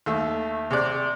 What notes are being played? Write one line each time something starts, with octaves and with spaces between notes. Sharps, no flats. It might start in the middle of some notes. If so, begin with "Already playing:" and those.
D#2 A3 E5
C3 G#4 D5 F#6